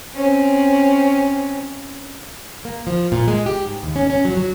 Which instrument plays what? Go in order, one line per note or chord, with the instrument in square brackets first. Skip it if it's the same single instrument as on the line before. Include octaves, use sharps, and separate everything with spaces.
[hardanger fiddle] C4 C#4
[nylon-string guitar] A#3
F3
A#2
G#3
G4
G#2
D#2
C#4
C#4
F#3
F#3